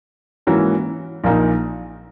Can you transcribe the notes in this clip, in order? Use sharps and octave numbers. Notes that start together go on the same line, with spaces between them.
G#2 E3 A#3 C#4 F#4
A#1 A#2 A#3 D#4